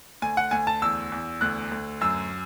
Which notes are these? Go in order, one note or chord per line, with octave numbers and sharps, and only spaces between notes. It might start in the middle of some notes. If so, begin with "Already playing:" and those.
D2 G#5
F#5
D2 G#5
A5
E2 E6
E2
D2 F#6
D2
F#2 E6